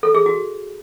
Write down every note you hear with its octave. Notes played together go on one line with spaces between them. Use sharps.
A4
G#4
F#4